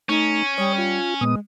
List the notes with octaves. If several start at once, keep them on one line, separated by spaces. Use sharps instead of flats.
A3 C#4 D#4
G3 C#5 D#6
F4
A#2 G#3 B3 D#6